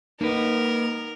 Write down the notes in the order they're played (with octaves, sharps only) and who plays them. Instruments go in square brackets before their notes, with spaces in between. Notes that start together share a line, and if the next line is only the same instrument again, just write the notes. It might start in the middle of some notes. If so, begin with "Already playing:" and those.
[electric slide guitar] A#3 B4 [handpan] D#4 [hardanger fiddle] A#4